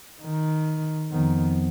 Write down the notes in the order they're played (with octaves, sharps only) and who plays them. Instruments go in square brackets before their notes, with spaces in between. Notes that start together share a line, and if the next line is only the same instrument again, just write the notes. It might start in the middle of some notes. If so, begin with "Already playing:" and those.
[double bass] D#3
[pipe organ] F2 F3 B3 [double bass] D#3